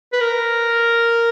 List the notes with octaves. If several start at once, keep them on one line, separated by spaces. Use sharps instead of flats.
B4
A#4